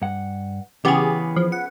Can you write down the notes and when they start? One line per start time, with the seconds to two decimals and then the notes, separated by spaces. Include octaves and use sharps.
0.02 G2 F#5
0.85 C#3 E3 B3 G4 G#4
1.36 F3
1.52 F#5